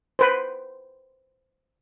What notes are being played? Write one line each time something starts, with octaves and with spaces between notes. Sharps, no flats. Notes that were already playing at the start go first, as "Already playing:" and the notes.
B4 C5